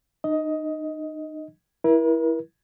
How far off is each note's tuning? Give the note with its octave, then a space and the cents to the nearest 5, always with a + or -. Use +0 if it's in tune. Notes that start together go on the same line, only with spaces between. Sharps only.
D#4 -30 D#5 +15
E4 +0 A#4 +45